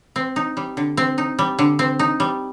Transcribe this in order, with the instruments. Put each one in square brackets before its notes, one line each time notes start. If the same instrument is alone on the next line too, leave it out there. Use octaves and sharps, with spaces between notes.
[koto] C4
D#4
G3
D3
C4
D#4
G3
D3
C4
D#4
G3